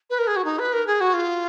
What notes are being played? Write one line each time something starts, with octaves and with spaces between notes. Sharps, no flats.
B4
A#4
G#4
F#4
D#4
B4
A#4
G#4
F#4
F4